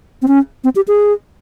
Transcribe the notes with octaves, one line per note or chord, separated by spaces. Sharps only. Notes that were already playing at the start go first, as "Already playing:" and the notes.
C4
C#4
C4
G4
G#4